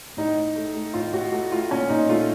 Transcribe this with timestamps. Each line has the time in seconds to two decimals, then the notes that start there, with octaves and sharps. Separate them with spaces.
0.17 A2 D#4
0.37 A2
0.56 A3
0.75 A3
0.94 A2 F4
1.13 A2 F#4
1.32 A3 F#4
1.52 A3 F4
1.71 A#2 C#4
1.90 A#2 D#4
2.09 A3 F4